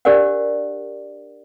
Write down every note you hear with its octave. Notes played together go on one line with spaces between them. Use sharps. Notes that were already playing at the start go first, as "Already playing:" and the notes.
D4 G4 A#4 C5 D5 F#5